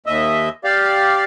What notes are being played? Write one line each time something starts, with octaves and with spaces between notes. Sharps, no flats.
D#2 D#5 E5
G4 D5 F5